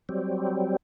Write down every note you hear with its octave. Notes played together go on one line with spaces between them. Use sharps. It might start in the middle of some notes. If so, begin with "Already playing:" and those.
F#3 G3 C4